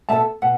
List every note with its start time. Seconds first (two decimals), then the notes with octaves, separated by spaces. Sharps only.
0.09 B2 B3 E4 A4 E5 A5
0.42 B2 F#5